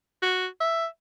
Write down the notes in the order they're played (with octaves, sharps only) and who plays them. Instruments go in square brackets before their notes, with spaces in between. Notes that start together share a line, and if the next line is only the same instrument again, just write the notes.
[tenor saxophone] F#4
E5